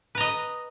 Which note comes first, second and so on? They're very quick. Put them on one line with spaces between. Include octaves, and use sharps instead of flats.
B4 A#5 D#5